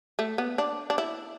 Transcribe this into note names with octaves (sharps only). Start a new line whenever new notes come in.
A3
B3
D4
D4
E4